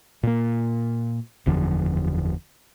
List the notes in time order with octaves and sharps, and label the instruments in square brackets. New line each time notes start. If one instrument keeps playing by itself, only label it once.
[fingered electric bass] A#2 A#3
F#1 E2 D3 F3